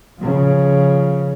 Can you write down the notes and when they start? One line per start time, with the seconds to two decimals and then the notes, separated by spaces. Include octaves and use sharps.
0.19 C#3 F3